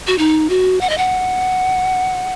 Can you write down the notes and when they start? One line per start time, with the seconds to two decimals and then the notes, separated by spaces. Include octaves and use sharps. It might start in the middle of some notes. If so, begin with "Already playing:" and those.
0.07 F#4
0.18 D#4
0.50 F#4
0.81 F#5
0.90 D#5
0.98 F#5